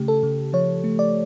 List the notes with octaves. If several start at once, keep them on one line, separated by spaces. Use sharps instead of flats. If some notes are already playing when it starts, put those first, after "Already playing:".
Already playing: C#3 A3 G4
A4
C#3
F3 C#5
A3
D5